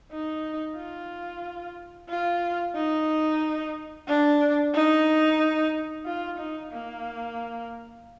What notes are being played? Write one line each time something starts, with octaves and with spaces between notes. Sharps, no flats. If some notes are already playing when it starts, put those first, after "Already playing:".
D#4
F4
F4
D#4
D4
D#4
F4
D#4
A#3